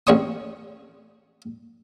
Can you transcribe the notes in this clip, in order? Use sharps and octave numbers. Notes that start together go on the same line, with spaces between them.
A1 C4 C#5 C#6 D#6